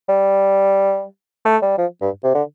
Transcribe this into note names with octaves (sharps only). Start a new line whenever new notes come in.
G3
A3
G3
F3
G2
C3
D3